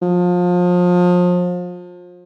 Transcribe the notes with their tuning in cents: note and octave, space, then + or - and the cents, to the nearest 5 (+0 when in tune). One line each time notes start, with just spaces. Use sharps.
F3 +30